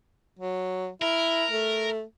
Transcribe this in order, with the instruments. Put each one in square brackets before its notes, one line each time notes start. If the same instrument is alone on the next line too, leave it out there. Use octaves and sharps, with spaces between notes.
[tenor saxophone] F#3
[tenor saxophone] E4 [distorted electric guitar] A#4
[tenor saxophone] A3